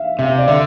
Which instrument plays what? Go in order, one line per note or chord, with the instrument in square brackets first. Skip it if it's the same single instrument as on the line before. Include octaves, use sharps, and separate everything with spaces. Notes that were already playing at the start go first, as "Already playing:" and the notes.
Already playing: [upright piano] E5 F5
[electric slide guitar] C3 [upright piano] E5
[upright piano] D5
[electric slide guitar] D3 [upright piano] E5